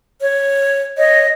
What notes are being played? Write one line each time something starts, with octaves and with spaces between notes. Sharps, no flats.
C#5
C#5 D#5